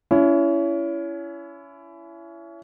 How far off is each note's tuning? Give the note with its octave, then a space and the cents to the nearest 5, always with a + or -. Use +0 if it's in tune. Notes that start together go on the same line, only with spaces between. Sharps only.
C#4 +30 E4 +25